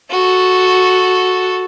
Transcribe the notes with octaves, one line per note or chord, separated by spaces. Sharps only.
F#4 A4